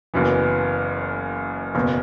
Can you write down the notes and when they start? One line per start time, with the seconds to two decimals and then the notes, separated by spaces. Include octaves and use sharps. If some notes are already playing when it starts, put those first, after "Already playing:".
0.14 F#1 F#2 E3 B3
1.75 F#1 E2 B2